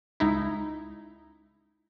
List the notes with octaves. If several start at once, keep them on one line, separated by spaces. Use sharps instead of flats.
C#2 D#4 E4